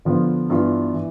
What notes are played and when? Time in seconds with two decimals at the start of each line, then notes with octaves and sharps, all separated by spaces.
0.05 D3 F3 B3 F4
0.50 G2 E3 B3 F4
0.93 E3